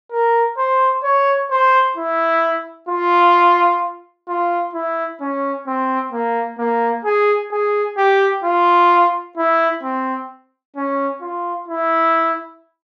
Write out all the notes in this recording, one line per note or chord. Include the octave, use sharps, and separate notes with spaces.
A#4
C5
C#5
C5
E4
F4
F4
E4
C#4
C4
A#3
A#3
G#4
G#4
G4
F4
E4
C4
C#4
F4
E4